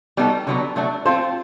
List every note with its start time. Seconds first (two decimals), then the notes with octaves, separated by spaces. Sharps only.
0.17 G3 B3 D#4 F#4 A4
0.47 D3 F#3 B3
0.76 F#3 A3 D4 F#4
1.05 C4 F4 A4 C5